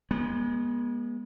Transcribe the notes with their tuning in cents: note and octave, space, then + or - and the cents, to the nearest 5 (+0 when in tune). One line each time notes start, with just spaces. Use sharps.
G#3 -5 B3 -40